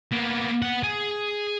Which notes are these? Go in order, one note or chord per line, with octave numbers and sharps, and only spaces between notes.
A#3 B3
B3 F#5
G#4